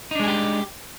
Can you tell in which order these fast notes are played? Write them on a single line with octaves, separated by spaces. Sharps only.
D#4 D4 G#3 G#4 G4